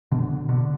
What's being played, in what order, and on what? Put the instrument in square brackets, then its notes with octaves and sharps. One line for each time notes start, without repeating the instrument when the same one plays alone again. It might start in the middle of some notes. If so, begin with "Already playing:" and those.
[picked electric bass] B2 D3
B2 D3